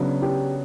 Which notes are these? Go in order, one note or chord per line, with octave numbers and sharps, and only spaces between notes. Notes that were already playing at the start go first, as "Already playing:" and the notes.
Already playing: C#3 F#3 B3 D4
G4